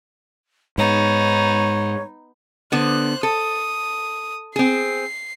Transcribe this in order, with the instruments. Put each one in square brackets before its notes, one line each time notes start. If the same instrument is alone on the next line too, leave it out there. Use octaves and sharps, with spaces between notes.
[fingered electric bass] G#2 [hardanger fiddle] B3 D#4 [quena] C#5
[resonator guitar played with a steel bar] D3 B3 [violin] C5 F#6
[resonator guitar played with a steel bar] A4 [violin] D#6
[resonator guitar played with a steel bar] C4 G#4 [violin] C7